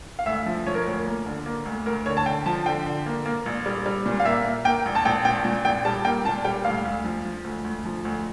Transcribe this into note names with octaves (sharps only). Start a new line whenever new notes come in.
F5
D2 E5
F3
F3 C#5
A#4
D2 C#5
A#3
D3
A#3
D2
D2 A#4
D3 C#5
A5
D3 G5
F3 A5
D3 G5
D3
A#3
A#3
A#1
G3
G3
A#2
F5
A#3 E5
A#3
A#3 G5
A#1
A5
A#1 G5
A#2 G5
A#2
A#1 G5
G3 A5
A#3 G5
A#2 A5
G3 G5
D2 F5
D2
F3
F3
D2
D2
F3
D2